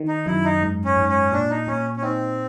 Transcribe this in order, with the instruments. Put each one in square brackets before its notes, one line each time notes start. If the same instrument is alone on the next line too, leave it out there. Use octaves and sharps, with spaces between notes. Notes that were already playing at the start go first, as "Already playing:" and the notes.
Already playing: [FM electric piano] D#3
[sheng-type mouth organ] D#4
[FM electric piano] F#2 [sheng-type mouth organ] E4
[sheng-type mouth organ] D#4
[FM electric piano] G#2
[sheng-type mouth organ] C#4
[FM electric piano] G#2
[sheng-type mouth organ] C#4
[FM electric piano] A#2 [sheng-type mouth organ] D4
[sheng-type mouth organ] D#4
[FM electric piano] A#2 [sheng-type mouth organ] C#4
[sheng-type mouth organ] C#4
[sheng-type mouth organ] C4 [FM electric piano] D#4